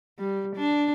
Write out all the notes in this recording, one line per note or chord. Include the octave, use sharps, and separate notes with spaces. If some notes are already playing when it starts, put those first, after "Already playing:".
G3
D4